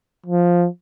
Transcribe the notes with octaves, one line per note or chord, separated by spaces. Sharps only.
F3